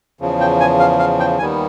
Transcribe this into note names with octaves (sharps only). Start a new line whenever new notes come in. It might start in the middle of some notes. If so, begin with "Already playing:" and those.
E2 C#3 F3
G5
G#5
F5
F5
G5
D#2 D#3 G3 B3 G#5